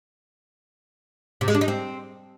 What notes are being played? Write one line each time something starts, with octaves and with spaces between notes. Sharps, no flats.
C3
G#3
D4
D#4
C4